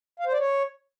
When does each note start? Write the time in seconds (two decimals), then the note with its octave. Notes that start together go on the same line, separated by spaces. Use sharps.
0.20 F5
0.26 C5
0.33 D5
0.39 C#5